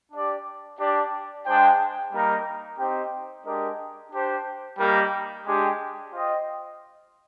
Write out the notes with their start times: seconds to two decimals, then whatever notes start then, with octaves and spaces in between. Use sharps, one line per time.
0.12 D4 G4 D5
0.78 D4 G4 D5
1.46 G#3 D4 G#4 C5 G5
2.12 G3 A#3 D#4 A#4
2.78 C4 D#4 G4 C5 G5
3.45 G#3 D4 G4 A#4 D#5
4.12 D4 G4 C5
4.79 G3 A#3 D#4 G4 A#4
5.46 G#3 D4 G4
6.12 F4 C5 D#5 G5